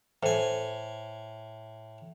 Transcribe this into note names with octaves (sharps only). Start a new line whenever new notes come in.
A2 A4 C5 G#5